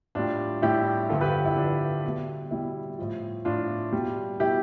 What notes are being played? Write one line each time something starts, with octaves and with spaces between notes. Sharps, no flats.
A2 G3 D4 F4
A2 G3 E4 G4
G2 D3 F3 F4 A4
G4 B4
E4
G2 D3 F3 D4
B2 G3
B2 G3 E4
A2 F3
A2 F3 D4 F4
B2 G3
B2 G3 E4 G4